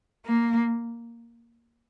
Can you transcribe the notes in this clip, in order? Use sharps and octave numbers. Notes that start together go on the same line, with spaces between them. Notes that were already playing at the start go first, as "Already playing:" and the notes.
A#3